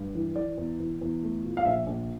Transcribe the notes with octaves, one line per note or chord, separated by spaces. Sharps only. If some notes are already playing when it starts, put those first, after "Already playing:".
Already playing: G2
E3
E3 D5
E2
E2
E2
A3
A#2
F5
A#1 E5
A#1